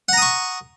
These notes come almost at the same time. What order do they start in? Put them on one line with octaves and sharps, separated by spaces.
F#5 A#5 D#6 C#6